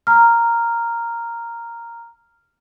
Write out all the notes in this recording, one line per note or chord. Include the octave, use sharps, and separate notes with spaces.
A#5 F6